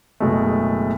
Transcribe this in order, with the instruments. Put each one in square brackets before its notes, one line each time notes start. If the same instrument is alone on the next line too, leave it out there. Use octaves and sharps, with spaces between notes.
[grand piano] F#1 B2 G#3 A3